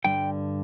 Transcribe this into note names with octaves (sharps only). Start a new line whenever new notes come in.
G2 D3 G3 G5